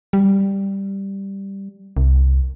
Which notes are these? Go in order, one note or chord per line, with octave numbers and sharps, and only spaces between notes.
G3
C2